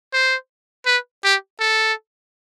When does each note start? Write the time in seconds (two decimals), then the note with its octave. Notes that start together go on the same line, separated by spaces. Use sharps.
0.13 C5
0.86 B4
1.24 G4
1.60 A4